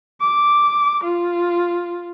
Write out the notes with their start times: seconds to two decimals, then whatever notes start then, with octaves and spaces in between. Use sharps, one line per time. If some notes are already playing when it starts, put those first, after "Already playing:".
0.21 D6
1.04 F4